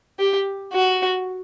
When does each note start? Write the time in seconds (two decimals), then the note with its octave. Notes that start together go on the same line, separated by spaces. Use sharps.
0.19 G4
0.73 F#4